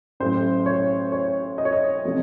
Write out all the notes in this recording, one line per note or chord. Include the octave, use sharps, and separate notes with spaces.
A1 A2 F#3 C5
C#5
C#5
D#5
C#5
D#5
C3 F3 A3